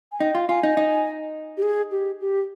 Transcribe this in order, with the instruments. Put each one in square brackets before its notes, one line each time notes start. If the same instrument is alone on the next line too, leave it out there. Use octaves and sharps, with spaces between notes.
[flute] G#5
[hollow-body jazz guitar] D#4 [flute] G5
[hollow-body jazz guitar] F4
[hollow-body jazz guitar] F4 [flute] G#5
[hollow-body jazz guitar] D#4
D#4
[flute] G4
G#4
G4
G4